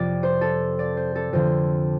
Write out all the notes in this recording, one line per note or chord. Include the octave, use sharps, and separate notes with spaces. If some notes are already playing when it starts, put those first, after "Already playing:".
Already playing: F2 C3 D5
C5
A4
D5
C5
A4
F2 D3 C5